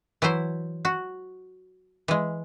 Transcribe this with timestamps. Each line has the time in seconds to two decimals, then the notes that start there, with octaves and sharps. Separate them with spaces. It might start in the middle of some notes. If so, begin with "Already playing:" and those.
0.22 E3 F#3 E4 C5
0.85 F#4
2.08 E3 G#3